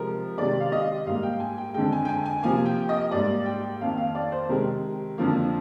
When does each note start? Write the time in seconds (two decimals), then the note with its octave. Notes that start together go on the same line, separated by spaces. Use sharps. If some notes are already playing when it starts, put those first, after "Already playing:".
Already playing: C3 F3 G#3 A#4
0.37 C3 D#3 G#3 D5
0.60 F5
0.72 D#5
1.06 G#2 G3 A#3 F5
1.23 G5
1.40 G#5
1.58 G5
1.74 F2 D3 G#3 G5
1.92 G#5
2.05 G5
2.09 G#5
2.26 G#5
2.43 C3 F3 A#3 G#5
2.66 G5
2.89 D#5
3.11 G#2 G3 A#3 D5
3.46 G5
3.81 F2 D#3 A#3 F5
3.97 F5
4.15 D5
4.32 C5
4.49 C3 D#3 G#3 A#4
5.18 F2 D3 F3 A#3